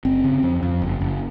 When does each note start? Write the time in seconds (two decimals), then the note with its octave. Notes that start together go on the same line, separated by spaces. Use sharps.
0.05 F#1 C4
0.24 C#3
0.43 F2
0.63 F2
0.82 F#1
1.01 F#1